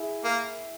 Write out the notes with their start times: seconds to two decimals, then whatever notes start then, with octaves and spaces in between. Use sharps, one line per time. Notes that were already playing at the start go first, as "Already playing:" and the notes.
Already playing: E4 G#4
0.25 A#3